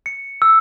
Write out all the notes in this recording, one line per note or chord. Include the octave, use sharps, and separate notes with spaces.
C#7
E6